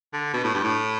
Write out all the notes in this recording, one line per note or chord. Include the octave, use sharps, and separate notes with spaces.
D3
B2
A2
G2
A2